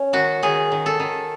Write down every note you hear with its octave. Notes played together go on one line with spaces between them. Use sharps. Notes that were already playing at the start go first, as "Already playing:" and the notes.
Already playing: C#4
D#3 F#4
D#3 G#4
D#3
A4
D#3